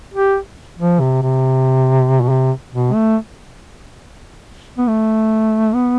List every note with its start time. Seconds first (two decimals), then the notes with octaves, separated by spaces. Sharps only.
0.14 G4
0.78 F3
1.00 C3
1.22 C3
2.21 B2
2.29 C3
2.72 B2
2.94 A3
4.78 B3
4.88 A3
5.74 B3